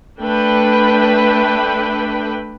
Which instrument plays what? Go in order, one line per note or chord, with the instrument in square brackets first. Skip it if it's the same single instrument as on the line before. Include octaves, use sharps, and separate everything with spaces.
[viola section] A3 D4 B4 G5 B5